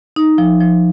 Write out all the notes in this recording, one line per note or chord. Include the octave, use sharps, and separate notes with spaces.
D#4
F3
F3